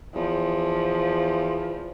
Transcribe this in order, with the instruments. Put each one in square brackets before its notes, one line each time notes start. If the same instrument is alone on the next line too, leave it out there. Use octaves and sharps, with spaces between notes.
[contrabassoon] E2 [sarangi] F3